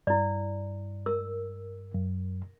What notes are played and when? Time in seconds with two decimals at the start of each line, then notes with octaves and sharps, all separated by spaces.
0.07 G2 E4 D5
1.06 A#4 E6
1.94 F#2